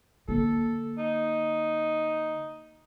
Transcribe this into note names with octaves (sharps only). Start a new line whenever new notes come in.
D3 A#3 A4
D#4